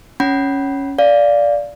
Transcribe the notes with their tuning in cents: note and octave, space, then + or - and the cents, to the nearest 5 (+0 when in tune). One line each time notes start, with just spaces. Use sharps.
C#4 +0 F#5 +40 B5 -15
D5 -10 F5 +0